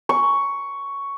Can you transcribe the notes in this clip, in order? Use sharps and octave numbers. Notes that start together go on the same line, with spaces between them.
C#6